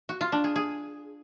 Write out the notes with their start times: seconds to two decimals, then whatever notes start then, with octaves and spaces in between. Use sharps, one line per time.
0.09 F#4
0.21 F4
0.32 D4
0.44 G#4
0.56 G#4